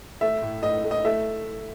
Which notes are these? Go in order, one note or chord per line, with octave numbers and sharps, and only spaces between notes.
A3 E5
A2
A2 D#5
A3
D#5
A3 E5